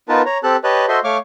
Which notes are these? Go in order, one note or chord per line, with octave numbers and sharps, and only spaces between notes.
B3 D#4 F4 A#4 B4 A5
C#5 A#5
C4 G4 A4 A5 F#6
G4 B4 C#5 D#5 A5 F#6
F#4 A4 C5 D#5 E5 C6
A3 C#5 F5 C#6 D6 F6